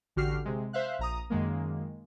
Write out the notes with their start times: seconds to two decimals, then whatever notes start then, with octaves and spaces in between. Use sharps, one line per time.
0.16 A1 D3 F#4 G4 F6 C7
0.45 C3 G#3
0.73 C5 E5 F5 F#6
0.99 A#1 A#5 D#6
1.30 F#2 D#3 G#3 A#3